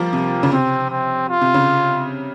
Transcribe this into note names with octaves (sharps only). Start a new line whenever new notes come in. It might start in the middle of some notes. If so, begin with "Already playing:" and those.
Already playing: F3 G3 A#3
C3
C#3
C3 C4
C4
F4
C3
C#3